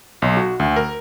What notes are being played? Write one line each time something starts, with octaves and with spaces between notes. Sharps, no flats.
B1
F#4
D2
A#4